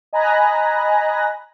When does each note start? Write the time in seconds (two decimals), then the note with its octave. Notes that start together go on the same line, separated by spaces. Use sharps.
0.13 D#5 G#5 A#5 B5 F#6 A#6